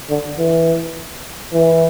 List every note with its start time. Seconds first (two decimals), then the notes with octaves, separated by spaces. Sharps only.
0.09 D3
0.38 E3
1.53 E3